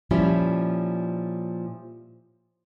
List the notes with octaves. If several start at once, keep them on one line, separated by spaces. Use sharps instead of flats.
A#2 F3 G3 C#4 E4